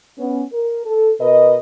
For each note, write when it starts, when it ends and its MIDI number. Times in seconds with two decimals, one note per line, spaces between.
0.19 0.43 59
0.19 0.43 61
0.52 0.83 70
0.85 1.12 69
1.20 1.58 47
1.20 1.58 70
1.20 1.58 71
1.20 1.58 75